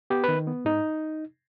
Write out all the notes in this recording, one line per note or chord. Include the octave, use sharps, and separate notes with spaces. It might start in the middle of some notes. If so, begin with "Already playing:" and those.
B3 G4
D#3 B4
B3
G#2 D#4